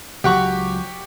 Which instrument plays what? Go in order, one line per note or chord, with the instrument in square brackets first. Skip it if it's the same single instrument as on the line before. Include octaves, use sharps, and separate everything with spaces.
[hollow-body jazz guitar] C#2 F#3 [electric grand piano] G4 F#5 C#6